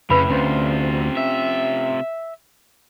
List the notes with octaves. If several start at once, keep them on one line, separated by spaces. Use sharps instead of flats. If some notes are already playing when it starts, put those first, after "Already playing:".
F2 A2 C#3 B4 B5
D2 C3 C4 C#4 F4 C5
E5